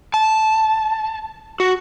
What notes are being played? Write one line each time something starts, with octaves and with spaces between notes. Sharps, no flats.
A5
F#4